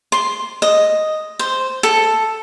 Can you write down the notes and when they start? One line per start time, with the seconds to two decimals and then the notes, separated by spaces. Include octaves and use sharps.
0.12 C6
0.62 D#5
1.39 C5
1.83 A4